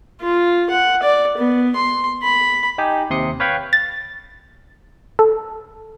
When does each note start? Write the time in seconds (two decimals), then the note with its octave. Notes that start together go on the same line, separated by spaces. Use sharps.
0.21 F4
0.70 F#5
1.03 D5
1.38 B3
1.76 C6
2.23 B5
2.78 D#4 G4 G#5
3.10 D#2 C3 C6 D#6 C#7
3.40 B4 C#5 F5 G5 B5 C#6
3.73 A6
5.19 A4